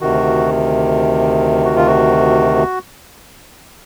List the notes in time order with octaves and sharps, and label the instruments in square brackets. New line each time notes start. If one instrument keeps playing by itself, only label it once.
[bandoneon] D2 C3 D#3 F#4
F#4
F4
F#4